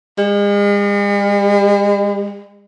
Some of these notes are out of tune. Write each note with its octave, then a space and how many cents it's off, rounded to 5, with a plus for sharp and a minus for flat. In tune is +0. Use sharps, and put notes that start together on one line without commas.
G#3 -45